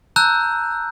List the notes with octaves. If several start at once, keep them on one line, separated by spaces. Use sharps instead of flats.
A5 A#5 E6 F#6 G6